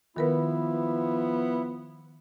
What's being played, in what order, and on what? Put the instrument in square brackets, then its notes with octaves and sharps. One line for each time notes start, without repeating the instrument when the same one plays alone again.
[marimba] D#3 A#4 B4 [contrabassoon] F3 [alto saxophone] B3 [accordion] E4